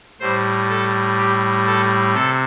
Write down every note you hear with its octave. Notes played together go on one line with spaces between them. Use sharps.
A2 G3 C5
A4
G4
A4
C3 A4